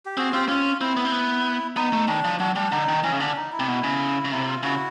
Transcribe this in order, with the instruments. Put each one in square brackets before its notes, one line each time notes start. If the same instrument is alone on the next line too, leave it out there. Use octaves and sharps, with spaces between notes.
[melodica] G4
[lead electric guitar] C4 [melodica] F#4 G#4
[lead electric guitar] C4 [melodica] F4 G4
[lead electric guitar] C#4 [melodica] F4
[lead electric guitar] C4 [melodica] E4
[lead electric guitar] B3
C4
B3
[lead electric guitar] B3 [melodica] D#4
[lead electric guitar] A3
[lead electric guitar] D#3 [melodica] D4
[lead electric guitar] F3
[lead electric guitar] F#3 [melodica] D4
[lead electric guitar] G3 [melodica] D4
[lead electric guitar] D3 [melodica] D#4
[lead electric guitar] D#3
[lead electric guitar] E3 [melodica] C#4
[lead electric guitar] C#3
[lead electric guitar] D3 [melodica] D4
[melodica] D#4
E4
[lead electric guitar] C3
B2
C#3
C#3
[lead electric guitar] C3 [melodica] E4
[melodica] F4
[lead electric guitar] C#3 [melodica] E4 F#4